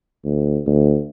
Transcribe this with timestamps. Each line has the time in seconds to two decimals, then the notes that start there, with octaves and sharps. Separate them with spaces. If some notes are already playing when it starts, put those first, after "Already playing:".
0.24 D2
0.67 D2